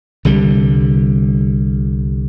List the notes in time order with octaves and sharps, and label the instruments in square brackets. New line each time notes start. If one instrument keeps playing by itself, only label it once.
[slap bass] C2 D3 G3